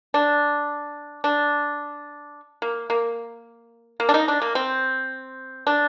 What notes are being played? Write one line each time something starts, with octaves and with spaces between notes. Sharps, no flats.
D4
D4
A#3
A#3
A#3
D4
D#4
D4
A#3
C4
D4